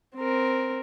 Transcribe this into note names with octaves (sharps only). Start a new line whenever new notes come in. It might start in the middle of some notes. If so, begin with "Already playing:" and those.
C4 A#4